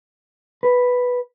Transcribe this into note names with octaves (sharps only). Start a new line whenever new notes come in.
B4